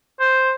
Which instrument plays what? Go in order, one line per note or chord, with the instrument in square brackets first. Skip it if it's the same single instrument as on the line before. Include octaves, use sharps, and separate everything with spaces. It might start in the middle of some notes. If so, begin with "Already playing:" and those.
[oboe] C5